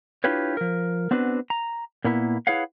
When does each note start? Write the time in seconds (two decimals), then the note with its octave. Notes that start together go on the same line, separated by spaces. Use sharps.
0.24 D4 E4 F4 G4 B4 C#5
0.57 F3 A#4
1.11 B3 C4 D4 F#4 B4
1.50 A#5
2.04 A#2 A#3 B3 E4
2.47 E4 G#4 B4 C#5 F5 F#5